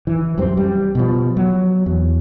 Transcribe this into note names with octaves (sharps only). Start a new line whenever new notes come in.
E3
C2 F#2 C3 C4
G3
B2 F3
F#3
E2